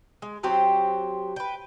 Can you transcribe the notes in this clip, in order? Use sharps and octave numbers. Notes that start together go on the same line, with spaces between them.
G#3
F#3 C4 G4 C5
B4 G5